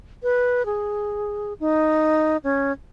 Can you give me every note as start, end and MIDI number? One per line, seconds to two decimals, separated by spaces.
0.23 0.65 71
0.66 1.53 68
1.60 2.37 63
2.44 2.72 61